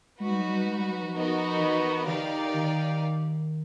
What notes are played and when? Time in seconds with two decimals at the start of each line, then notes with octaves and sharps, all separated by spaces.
0.20 G#3 D#4 F#4 B4
0.30 G3
0.40 F#3
0.51 G3
0.66 G#3
0.79 G3
0.90 F#3
1.02 F3
1.14 B3 D#4 F#4 A#4 D#5
1.60 E3
2.07 D3 D#4 G4 A#4 D5 F5
2.54 D#3